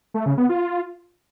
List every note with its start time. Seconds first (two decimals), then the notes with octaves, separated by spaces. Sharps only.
0.14 A3
0.26 C#3
0.38 B3
0.49 F4